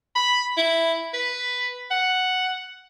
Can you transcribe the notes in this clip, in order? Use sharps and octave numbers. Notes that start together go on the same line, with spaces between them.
B5
E4
B4
F#5